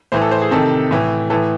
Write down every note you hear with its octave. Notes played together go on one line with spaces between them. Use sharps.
A2 E3 C5
A4
C5
G#4
C3 D#3 A4
A2 E3
A2 E3 A4